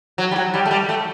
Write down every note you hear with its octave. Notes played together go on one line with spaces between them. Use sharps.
F#3
G3
F#3
G3
A3
G3
A3